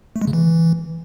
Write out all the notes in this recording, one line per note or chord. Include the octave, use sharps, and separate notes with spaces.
A3
G#3
C#3
E3